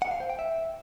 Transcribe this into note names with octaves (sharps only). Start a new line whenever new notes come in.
F#5
F5
C5
G5
E5